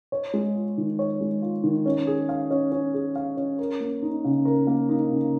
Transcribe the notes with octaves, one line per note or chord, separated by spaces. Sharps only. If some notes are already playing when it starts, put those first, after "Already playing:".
C#5
G#3
F4
D#3
C#5
G#3
F4
D#3
C#4
G#4
F5
C#4
C#4
G#4
F5
C#4
A#4
A#3
D#4
C#3
A#4
A#3
D#4
C#3